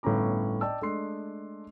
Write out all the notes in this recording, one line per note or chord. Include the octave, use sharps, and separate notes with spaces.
G1 A2 B3 C#4 A#5 D6
D5 D#5 G5 A5 E6
G#3 A3 D4 C6 C7